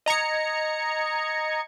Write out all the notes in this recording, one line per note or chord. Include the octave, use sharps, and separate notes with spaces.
D#5 A#5 G#6 C#7